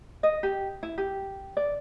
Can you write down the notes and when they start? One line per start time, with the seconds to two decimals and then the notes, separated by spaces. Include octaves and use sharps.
0.23 D#5
0.43 G4
0.83 E4
0.98 G4
1.57 D5